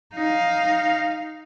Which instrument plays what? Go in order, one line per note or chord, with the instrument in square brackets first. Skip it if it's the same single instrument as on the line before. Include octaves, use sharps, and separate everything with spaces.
[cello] D#4 F5